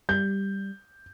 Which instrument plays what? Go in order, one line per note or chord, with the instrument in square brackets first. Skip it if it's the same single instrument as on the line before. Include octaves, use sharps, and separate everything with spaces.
[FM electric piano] G3 [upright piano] G6